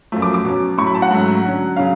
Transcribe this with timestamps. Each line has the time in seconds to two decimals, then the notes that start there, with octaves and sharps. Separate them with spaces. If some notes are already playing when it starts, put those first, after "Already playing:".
0.12 F#2 F3 A3
0.22 D6
0.34 D6
0.45 B2 F#3 C#4
0.78 A2 F#3 C#4 C#6
0.87 B5
0.95 A5
1.02 F#5
1.11 G#2 F#3 A3 C#4
1.45 D3 F#3 C#4
1.76 C#3 F#3 C#4 F5